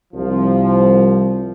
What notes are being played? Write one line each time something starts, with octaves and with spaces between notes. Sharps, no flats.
C2 F3